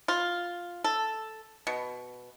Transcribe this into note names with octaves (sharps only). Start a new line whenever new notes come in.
F4
A4
B2